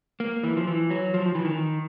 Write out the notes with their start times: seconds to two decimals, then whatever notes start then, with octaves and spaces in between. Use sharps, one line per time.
0.20 A#3
0.43 E3
0.57 F3
0.67 E3
0.90 F#3
1.14 F3
1.26 F3
1.35 E3
1.45 D#3